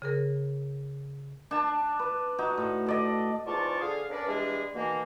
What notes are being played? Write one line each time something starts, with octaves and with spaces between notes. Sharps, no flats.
C#3 G#4 A#4
D4 A5
B4
D#4 F#4
A2
A4 D5 D#5
E2 G#2 F4 D5 A5 C#6
D3 G#4 F5
C#4 D4 A#4 B4 D5
E3 G3 G#3 D4 G#4
B2 D#3 E3 A#3